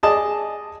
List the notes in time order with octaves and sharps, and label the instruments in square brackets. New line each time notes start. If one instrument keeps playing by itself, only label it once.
[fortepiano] G#4 D5 D#5 A5